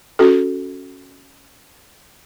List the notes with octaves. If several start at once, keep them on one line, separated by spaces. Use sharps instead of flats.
C#4 F#4 A4